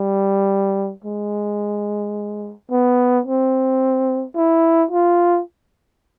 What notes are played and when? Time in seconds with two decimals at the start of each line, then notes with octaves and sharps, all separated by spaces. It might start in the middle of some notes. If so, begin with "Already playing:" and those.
Already playing: G3
1.04 G#3
2.71 B3
3.26 C4
4.36 E4
4.91 F4